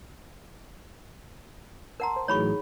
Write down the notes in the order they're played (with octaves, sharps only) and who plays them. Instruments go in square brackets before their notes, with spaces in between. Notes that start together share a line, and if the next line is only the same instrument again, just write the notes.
[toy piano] A#4 F#5 A#5 [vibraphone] A5 C6
[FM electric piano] C5
[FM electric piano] A2 E3 F#3 [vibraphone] D#4 G#4 [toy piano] C#5 B5 C#6